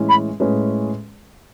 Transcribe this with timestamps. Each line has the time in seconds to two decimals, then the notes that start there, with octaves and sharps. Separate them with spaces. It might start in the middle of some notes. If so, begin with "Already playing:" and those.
Already playing: A2 E3 G#3 C#4
0.09 B5
0.40 A2 G#3 C#4 G#4 B4